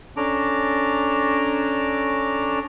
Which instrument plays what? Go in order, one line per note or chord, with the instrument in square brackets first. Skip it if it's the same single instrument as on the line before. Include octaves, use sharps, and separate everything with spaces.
[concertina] C#4 D4 A4 A#5 D6